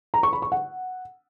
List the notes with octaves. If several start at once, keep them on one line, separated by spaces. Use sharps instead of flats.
A#5
C#6
B5
C#6
F#5